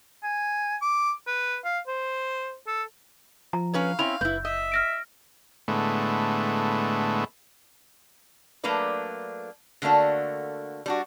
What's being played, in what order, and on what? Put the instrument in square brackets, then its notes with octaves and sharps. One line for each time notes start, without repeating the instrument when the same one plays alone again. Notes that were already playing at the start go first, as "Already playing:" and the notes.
[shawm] G#5
D6
B4
F5
C5
A4
[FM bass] F3 [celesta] A#5
[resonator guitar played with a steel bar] C#4 B4 C#5 [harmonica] F5
[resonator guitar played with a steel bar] C4 C#4 E4 [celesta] B5 F7
[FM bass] F#1 [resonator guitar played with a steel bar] E4 B4 [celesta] G6
[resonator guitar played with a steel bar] D#5 [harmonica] E5
[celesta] F6 A#6 D7
[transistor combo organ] A2 D3 G#3 A3 B3
[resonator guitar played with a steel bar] F#3 A3 A#3 D4 B4 D5
D3 A3 A#3 D4 F#4
G3 D4 F#4